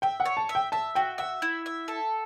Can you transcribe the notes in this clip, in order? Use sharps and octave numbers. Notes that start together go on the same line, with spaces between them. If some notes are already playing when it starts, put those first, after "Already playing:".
E5 G5
F#5
C#5
A5
E5
G5
E5 A5
F#4 G5
E5 F#5
E4
E5
A4